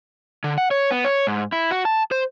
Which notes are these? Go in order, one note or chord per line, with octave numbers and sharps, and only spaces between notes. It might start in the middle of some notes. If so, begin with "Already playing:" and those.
D3
F#5
C#5
B3
C#5
G#2
E4
F#4
A5
C5